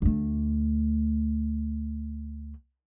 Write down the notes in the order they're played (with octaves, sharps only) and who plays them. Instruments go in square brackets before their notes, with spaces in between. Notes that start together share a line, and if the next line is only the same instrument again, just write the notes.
[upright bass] D2 A3